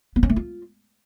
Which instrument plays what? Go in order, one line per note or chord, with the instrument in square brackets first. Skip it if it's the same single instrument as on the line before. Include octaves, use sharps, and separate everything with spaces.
[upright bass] B3
C#4
A3
F4